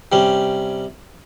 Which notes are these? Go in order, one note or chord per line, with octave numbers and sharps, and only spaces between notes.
C3 G3 C#4